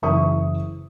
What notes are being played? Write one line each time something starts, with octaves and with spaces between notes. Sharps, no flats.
F#1 E3 E5 C#6 D#6